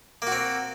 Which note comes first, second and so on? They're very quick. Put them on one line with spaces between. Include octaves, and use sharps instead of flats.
A#3 F#4 C4